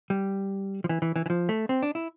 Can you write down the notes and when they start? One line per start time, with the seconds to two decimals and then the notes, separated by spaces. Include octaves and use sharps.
0.10 G3
0.84 F3
0.89 E3
1.02 E3
1.16 E3
1.26 E3
1.30 F3
1.49 A3
1.69 C4
1.83 D4
1.95 E4